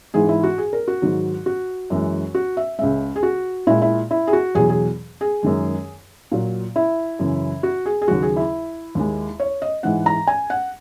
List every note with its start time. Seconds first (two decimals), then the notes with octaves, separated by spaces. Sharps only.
0.14 G#2 E3 G#3 G#4
0.29 E4
0.43 F#4
0.58 G#4
0.73 A#4
0.88 F#4
1.02 G#2 D#3 F#3
1.46 F#4
1.90 F#2 E3 G#3
2.35 F#4
2.57 E5
2.78 C#2 C#3 G#3 E5
3.16 G#4
3.23 F#4
3.67 A#2 G#3 E4
3.82 E4
4.11 E4
4.27 G#4
4.33 F#4
4.55 E2 B2 F#3 G#4
4.69 G#4
5.21 G#4
5.43 F#2 D#3 G#3
6.32 A#2 F#3
6.76 E4
7.19 F#2 C#3 E3
7.63 F#4
7.86 G#4
8.02 G#4
8.08 D#2 C#3 F#3 F#4
8.22 G#4
8.37 E4
8.95 D#2 D#3 G#3
9.40 C#5
9.62 D#5
9.83 G#2 E3 G#3 F#5
10.06 A#5
10.27 G#5
10.50 F#5